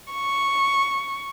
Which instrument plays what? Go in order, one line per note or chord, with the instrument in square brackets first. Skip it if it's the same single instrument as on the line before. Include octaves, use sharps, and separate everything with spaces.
[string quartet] C#6